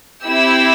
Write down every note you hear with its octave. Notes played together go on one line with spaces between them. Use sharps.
C4 E4 G4 E6